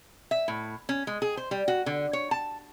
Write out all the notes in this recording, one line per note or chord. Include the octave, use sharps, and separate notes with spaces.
E5
A2
C#4
G#3
G#4
C5
G3
F#4
D3
C#5
A5